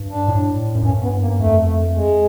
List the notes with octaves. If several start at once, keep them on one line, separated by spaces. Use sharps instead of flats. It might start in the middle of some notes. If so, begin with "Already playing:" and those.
Already playing: G2
D4
A2
F#2
G2 C#4
B3
A#3
F2 A3
G#3